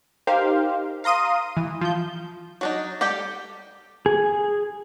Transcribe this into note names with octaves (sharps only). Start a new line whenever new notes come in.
D#4 G4 A#4 C5 F5
F5 A#5 C6 D#6 D#7
E3
F3 G6
F#3 D4 D#4
G3 G4 A4 G5
G#4